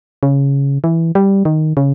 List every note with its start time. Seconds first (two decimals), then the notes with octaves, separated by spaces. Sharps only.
0.23 C#3
0.84 E3
1.15 G3
1.45 D#3
1.77 C#3